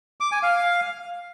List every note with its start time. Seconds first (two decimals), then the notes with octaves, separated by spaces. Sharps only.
0.20 D6
0.32 G#5
0.43 F5